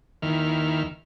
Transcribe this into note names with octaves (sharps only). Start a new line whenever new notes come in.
D#2 D#3 E4 F6